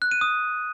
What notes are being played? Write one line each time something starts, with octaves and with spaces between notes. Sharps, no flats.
F#6
D#7
D#6